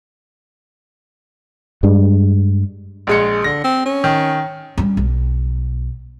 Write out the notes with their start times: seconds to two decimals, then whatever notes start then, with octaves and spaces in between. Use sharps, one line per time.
1.83 G2 G3 G#3 D4
3.07 A#1 G#3 C#7
3.44 D3 A#6
3.64 C4
3.86 C#4
4.04 D#3
4.78 G3 C#4
4.97 B1